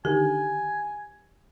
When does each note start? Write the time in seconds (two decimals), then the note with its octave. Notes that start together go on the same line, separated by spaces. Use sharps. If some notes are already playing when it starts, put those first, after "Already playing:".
0.05 D3 D#3 G4 G#5